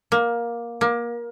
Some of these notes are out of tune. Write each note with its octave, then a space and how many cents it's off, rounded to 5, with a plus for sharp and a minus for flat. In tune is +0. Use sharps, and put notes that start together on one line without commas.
A#3 +15
A#3 +25